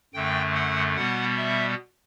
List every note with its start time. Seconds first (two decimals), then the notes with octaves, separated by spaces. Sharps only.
0.14 F#2 D3 A3 G5
0.54 F#5
0.96 B2 G3 B3 F#5
1.37 E5